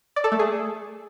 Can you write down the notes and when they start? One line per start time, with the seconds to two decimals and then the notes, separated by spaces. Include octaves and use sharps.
0.16 D5
0.24 A4
0.32 A3
0.39 G#4